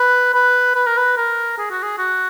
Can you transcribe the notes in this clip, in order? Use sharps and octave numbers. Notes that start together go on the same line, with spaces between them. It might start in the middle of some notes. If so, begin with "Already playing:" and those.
Already playing: B4
B4
B4
A#4
B4
A#4
G#4
F#4
G#4
F#4